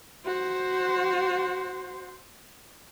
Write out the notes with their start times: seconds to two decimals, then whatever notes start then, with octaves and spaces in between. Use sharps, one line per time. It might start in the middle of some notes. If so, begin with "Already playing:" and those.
0.25 F#4 C5